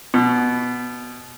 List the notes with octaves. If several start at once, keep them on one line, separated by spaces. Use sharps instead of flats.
B2